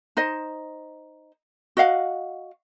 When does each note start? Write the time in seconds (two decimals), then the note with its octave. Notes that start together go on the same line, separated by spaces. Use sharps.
0.17 D#4 C5 D#5
1.77 F#4 D#5 F5 F#5